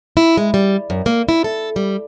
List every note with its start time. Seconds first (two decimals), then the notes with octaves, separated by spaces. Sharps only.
0.17 E4
0.37 G#3
0.54 G3
0.90 F#2
1.06 A#3
1.29 E4
1.44 A4
1.76 G3